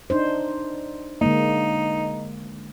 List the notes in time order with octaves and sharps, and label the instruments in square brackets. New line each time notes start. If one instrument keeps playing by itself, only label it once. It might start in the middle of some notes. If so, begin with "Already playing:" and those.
[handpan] D4 D#4 C5
[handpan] D3 G#3 A#3 [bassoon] D#4